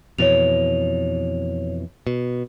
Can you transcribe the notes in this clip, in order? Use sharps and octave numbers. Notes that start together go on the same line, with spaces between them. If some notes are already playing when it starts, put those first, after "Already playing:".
F2 B2 E3 C#5 F7
B2